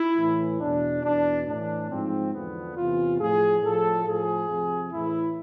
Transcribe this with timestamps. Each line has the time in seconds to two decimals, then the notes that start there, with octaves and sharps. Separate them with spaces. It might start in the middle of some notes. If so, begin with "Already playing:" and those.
Already playing: E4
0.17 A2 E3
0.60 E2 B2 D4
1.03 E2 B2 D4
1.46 A2 E3 D4
1.90 G#2 F3 C4
2.32 E2 D3 F3 B3
2.76 E2 C3 E3 F4
3.19 A2 F3 G#4
3.62 A2 F3 A4
4.05 A2 F3 G#4
4.48 F2 C3 F3
4.91 A2 E3 E4